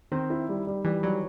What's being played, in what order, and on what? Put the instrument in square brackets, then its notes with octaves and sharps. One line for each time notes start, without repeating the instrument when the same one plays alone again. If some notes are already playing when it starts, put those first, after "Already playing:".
[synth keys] D#3 [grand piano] C4
[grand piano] E4
G3
G3
[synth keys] E3 [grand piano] G3
[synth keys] F#3 [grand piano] G3